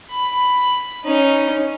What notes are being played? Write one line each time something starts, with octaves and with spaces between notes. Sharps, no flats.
B5
C#4 D#4